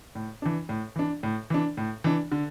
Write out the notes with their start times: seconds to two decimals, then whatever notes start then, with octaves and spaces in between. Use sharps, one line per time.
0.15 A2
0.42 E3 D4
0.69 A2
0.96 E3 D4
1.23 A2
1.50 E3 D4
1.77 A2
2.04 E3 D4
2.32 D3